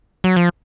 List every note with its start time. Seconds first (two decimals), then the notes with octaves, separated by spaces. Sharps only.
0.24 F#3
0.36 F3